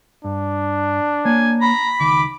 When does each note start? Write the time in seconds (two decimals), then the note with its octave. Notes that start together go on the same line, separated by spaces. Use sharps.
0.24 G2 D4
1.25 A#3 C#5 G#5
1.61 A#5 B5
2.00 C#2 D#3 D6